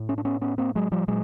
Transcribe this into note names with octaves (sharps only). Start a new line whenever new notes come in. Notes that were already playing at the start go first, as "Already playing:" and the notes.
Already playing: A2
C#4
D4
B3 C#4
B3 C#4
A#3 C4
F#3 G#3
F3 G3
A#2 F#3 G#3